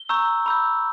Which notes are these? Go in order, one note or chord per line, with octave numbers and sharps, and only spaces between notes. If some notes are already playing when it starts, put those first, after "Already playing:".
Already playing: G7
A#5 C#6 E6 G6
B5 E6 G6